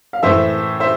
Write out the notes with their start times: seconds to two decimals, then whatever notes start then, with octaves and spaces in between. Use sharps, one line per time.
0.13 F5
0.23 A2 E3 C5 E5
0.80 C5 E5